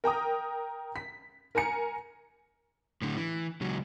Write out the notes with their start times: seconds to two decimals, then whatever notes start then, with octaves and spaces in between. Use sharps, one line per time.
0.04 A#4 G5 A#5 D#6
0.96 B6
1.55 A#4 G#5 A#5 C#7
3.02 A2 D3
3.17 E3
3.61 C#2 F#3